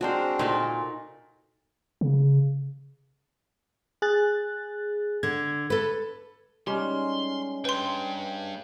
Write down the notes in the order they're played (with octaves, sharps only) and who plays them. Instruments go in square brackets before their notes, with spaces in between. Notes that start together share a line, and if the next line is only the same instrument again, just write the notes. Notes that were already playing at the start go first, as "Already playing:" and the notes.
[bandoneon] G#3 C4 D4 [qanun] F#4 A#4 C5
[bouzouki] A#2 [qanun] D#4 A4 D5
[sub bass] C#3
[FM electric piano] G#4 F#6 A6
[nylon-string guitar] D3 [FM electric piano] G#6
[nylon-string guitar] A4 B4
[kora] G3 [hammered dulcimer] G#3 C#4 D#4 [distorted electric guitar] C6
[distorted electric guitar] G2 G5 [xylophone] B4 C6